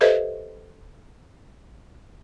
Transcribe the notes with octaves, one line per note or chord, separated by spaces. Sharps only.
G4 A4 B4 C5 D#5 E5